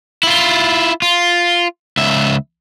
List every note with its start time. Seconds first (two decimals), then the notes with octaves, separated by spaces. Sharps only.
0.23 E4 F4
1.02 F4
1.97 C#2 E5